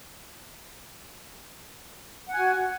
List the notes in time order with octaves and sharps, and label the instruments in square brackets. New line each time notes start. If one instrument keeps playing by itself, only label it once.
[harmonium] F#5
G#5
F#4